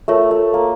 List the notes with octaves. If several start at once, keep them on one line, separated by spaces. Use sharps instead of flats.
A3 F4 A#4 C#5
A3
A#3